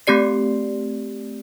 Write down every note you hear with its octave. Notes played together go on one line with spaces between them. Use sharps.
A3 C4 G4 D5 C7